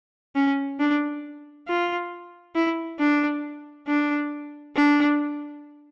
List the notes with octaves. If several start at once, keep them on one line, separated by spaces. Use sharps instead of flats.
C#4
D4
F4
E4
D4
D4
D4